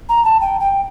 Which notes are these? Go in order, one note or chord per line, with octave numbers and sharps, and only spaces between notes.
A#5
A5
G5
G5